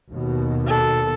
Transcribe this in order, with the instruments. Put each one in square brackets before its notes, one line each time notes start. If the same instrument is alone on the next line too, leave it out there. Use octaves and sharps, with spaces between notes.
[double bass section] D#2 B2
[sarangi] A4